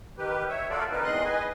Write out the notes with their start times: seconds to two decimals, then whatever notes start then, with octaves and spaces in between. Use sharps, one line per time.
0.18 D#3 G4 B4
0.49 C#5 E5
0.70 A#3 F4 F#4 A4 D5
0.91 C4 D#4 A#4 B4
1.04 E2 D#3 G#3 D#5 C6 F#6
1.25 B4 D#5 G#5